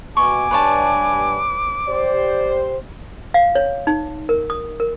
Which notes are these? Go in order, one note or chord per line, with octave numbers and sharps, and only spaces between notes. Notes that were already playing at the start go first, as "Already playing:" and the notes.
B2 G#5 C#6 D6
G2 B4 C#5 A5
G4 C5 D5
F5
C#5
D#4
A#4
D#6
A#4